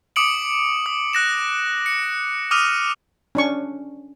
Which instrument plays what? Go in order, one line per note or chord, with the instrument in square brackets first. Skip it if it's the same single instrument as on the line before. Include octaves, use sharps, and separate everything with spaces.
[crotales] D6 D#6 C#7 D7 F#7
D#6
F#6 A#6 E7
C#7
D6 D#6 F6 D#7 F7
[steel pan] C#4 D4 C#6